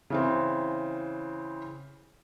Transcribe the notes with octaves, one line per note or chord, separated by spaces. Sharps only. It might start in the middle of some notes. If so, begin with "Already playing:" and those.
C#3 E3 C4